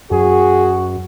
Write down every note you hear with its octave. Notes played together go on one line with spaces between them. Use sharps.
F#2 F#4 G#4